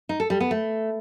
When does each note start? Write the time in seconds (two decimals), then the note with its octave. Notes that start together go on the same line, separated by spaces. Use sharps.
0.09 D#4
0.20 A4
0.30 G3
0.40 B3
0.51 A3